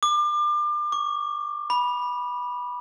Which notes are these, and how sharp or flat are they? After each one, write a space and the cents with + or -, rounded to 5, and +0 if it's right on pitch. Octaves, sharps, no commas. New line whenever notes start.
D6 +30
D6 -40
B5 -15